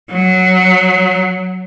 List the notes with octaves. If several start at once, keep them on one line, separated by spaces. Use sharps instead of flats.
F#3